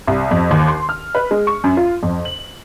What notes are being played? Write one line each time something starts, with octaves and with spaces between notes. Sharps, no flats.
C2
F2
D#2
C6
F6
B4
G#3
C#6
F#2
F4
F2
F#7